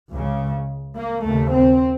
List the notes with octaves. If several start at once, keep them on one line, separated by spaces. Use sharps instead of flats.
C#2 C#3
A#3
D#2 C#3 A3
C4